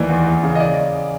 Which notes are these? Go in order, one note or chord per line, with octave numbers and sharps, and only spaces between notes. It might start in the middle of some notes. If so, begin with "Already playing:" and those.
Already playing: D#2 E3 D5
E2
E2
C#3
D#5
D5